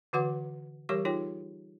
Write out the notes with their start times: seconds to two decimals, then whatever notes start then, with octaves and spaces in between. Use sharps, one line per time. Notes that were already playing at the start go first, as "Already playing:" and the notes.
0.13 D3 E3 F#4 B4 F#5 D6
0.89 E3 G3 G4 A#4 C#5 C#6
1.05 D#4 F4 G#4 C#5 G5